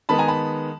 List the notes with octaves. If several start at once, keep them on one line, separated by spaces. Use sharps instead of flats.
D#3 G#3 B3 A5 B5
G#5 A#5
A5 B5